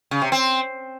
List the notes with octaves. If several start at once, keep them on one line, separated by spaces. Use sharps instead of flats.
C#3
C3
C4